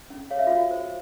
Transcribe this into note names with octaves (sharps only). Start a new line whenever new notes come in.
C#4
C#5 F5
E5
F4 F#4 F5
C5